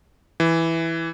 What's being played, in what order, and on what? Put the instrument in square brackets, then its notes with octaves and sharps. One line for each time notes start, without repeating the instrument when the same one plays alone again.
[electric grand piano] E3